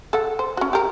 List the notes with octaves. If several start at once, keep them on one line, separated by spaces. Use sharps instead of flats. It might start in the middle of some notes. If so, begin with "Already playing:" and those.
A4 F#5
C5
C#4 F#4
G4 A#4